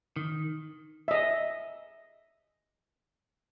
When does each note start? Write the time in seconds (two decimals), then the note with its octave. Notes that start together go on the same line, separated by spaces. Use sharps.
0.16 D#3
1.08 D#5 E5